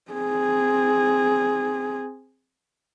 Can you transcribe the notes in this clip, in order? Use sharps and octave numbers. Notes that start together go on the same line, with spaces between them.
C4 G#4